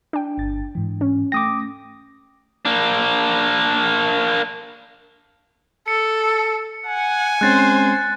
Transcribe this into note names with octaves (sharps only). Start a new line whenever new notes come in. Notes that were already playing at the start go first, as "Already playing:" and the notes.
D4 G5
G1 A6
G#2 E3
C#4
A3 G5 D6 D#6 A#6
A#3 D4
A4 C#7
F#5 G#5
G#3 C4 C#4 C5 F#6 A6